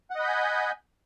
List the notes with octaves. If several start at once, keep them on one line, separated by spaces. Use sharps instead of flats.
D#5 F#5 G#5 B5 G6